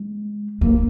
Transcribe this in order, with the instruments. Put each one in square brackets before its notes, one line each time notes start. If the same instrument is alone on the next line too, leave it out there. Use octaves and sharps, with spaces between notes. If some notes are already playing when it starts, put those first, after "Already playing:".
Already playing: [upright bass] G#3
A#3